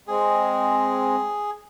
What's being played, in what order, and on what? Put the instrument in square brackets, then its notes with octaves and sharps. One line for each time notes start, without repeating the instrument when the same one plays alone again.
[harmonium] G#3 C4 [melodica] G#4